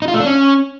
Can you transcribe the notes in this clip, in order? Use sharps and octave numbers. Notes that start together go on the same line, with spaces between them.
D#4
F4
A3
D4
C#4